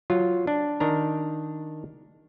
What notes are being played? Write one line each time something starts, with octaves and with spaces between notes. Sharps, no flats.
F#3 F4
D4
D#3 D4 A#5